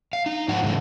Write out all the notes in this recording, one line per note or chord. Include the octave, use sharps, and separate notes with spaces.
F5
D#4
G#2 F3 F#3 F#5
G#2 C#3 E3 A3